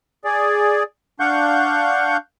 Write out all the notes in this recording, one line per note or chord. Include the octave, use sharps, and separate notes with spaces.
G#4 D5
D4 F5 F#5 C#6 G6